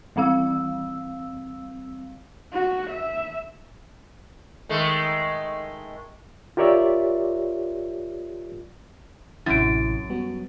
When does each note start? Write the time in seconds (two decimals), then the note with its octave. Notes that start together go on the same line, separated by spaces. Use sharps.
0.16 E3 G3 C4 F5 E6
2.53 F#4
2.90 E5
4.69 D#3 G#3 A3
6.57 F4 G4 A#4 C#5 D5 E5
9.46 A1 F#2 C3 E4 A6 D7
10.09 G3 B3 F#4